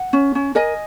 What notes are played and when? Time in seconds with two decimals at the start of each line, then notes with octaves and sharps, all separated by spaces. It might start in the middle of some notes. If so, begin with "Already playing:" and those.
Already playing: F#5
0.13 C#4
0.35 C#4
0.55 A#4 D#5 G#5